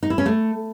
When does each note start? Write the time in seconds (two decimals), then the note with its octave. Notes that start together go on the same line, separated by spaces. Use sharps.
0.03 D#4
0.10 E4
0.18 C#4
0.26 A3